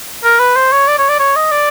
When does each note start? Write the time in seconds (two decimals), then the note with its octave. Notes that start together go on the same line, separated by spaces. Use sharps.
0.24 A#4
0.40 B4
0.56 C5
0.72 C#5
0.88 D5
0.98 C#5
1.09 D5
1.19 C#5
1.36 D#5
1.51 D5